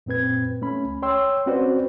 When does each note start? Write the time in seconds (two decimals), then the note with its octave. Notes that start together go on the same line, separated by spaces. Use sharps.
0.06 F#2 A#2 C4 B4 G#6
0.62 A3 C#4 B5
0.85 C#2
1.02 C#5 G5 C6 E6
1.46 C4 C#4 F#4 B4 C5 D5